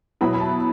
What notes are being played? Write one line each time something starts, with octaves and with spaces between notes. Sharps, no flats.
B2 F#3 B3 E4 B5
B5
A5